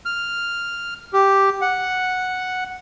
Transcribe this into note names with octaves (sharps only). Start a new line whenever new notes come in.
F6
G4
F#5